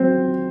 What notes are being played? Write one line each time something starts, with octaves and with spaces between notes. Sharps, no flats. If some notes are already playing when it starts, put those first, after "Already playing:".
Already playing: F#3 C4 C5